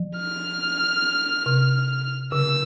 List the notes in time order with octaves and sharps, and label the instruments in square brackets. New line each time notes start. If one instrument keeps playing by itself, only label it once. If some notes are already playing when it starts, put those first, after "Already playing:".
Already playing: [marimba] F3
[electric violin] F6
[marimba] C3
[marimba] C#3 [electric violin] E6